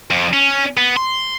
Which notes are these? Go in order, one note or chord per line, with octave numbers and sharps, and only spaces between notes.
F2
C#4
B3
C6